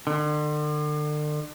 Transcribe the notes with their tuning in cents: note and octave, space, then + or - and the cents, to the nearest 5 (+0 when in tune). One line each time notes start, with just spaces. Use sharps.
D3 +40